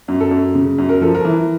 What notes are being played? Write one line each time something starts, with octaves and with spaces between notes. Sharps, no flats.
F#2
A4
F#2
C#3
F#2
A#4
F3 A4
A#4
E3